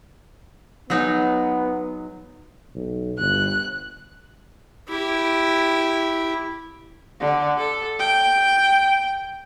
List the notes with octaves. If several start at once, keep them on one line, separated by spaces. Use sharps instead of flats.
F#3 G#3 B3 D#4
B1
G1 F#6
E4 G4
D3
A4
G5